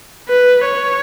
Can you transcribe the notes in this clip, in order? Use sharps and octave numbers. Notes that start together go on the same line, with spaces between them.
B4
C#5